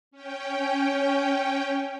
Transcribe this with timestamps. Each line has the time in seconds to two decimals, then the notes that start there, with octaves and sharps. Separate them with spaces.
0.11 C#4 G5